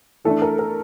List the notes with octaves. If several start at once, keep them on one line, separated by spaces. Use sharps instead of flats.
E3 A3 D4 A4
A#4
A#4